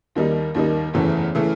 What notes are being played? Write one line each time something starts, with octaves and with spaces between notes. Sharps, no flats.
D#2 D#3 G3 A#3 D#4
D#2 D#3 G3 A#3 D#4
F#1 E2 C#3 E3 A3
C#3 E3 A3